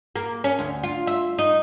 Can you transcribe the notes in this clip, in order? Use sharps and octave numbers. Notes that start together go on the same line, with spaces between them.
A#3
C#4
D2
F4
E5
D#4